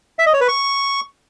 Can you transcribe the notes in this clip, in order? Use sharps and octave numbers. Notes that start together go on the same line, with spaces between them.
E5
D#5
C#5
B4
C#6